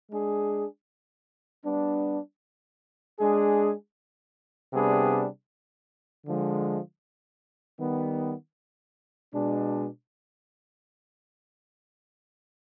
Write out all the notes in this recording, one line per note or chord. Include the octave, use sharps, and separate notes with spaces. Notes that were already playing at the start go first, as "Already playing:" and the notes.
G#3 D4 G#4
G3 B3 D4
G#3 D4 G#4
C3 G3 B3 D4 G#4
D3 F3 G#3
D#3 G3 B3
B2 G#3 D4